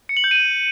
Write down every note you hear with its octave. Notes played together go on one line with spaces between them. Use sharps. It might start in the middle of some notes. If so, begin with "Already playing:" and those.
C#7
F#7
G6
D#7